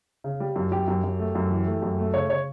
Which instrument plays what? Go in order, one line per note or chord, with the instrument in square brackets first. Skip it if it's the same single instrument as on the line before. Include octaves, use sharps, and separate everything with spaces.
[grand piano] C#3
G3
F#2
F#2 G4
F#2
F#2
A3
F#2
E3
A3
F#2
A3
C#3 C#5
C#3 C#5